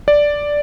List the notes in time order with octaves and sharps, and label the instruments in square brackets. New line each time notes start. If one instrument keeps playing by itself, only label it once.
[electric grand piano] D5